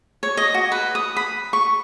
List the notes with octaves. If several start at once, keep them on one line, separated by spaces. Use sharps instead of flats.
C#5
D#5
F#4
B4
D#6
B5
C#6